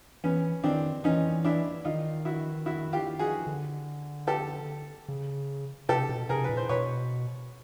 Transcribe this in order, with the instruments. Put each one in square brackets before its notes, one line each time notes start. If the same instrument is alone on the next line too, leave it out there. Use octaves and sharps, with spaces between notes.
[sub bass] E3 [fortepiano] B3 C#4
[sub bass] D#3 [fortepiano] C4 D4
[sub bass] E3 [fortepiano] C#4 D#4
[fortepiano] D4 E4
[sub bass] D#3 [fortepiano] D#4 F4
[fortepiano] E4 F#4
E4 F#4
F4 G4
F#4 G#4
[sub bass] D3
[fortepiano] G4 A4
[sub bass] C#3
[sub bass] C3 [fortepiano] G4 A4
[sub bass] B2
[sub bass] C3 [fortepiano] G#4 A#4
[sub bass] A#2 [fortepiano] B4
[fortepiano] C5
[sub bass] B2 [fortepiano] B4 C#5